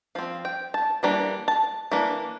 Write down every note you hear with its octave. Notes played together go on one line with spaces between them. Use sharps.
F3 C4 F5
G5
A5
E3 G3 A#3 D4 A#5
A5
E3 A#3 D4